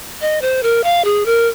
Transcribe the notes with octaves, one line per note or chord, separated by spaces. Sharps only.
D#5
C5
A#4
F5
G#4
A#4